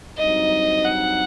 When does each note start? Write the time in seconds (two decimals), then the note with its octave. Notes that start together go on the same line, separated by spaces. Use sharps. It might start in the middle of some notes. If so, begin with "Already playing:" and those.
0.18 G2 F#3 C4 D#4 D#5
0.85 F#5